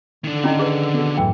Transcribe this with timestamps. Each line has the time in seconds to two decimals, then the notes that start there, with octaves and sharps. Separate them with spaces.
0.24 D3 D#3 D4
0.44 C#4 E4 D#5
0.59 G#4 B4
0.94 B3 F#4 A4
1.18 F#2 A2 E3 F#3 G5